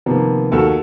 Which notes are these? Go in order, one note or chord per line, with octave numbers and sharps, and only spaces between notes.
C3 D#3 F3 A#3 B3
D#2 F#4 A4 E6